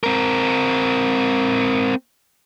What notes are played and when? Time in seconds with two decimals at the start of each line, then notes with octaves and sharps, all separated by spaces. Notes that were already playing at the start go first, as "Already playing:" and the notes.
0.04 C4 A#4